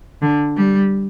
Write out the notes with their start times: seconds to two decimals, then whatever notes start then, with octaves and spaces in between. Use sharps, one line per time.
0.22 D3
0.57 G3